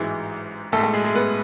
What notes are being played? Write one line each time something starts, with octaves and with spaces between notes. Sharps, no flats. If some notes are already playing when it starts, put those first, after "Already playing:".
Already playing: A1 G#2 E3 F#3 G#3
B1 A2 G#3 A3 A4
A3 A4
G#3 G#4
G#3 G#4
B3 B4